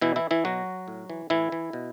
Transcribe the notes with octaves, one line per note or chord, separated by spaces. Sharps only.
B2 E3 E4
E3 E4
E3 E4
B2 F#3 F#4
A2
E3
A2 E3 E4
E3
B2